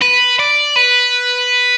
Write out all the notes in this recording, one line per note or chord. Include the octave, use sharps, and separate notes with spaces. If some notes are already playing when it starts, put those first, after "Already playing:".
B4
D5
B4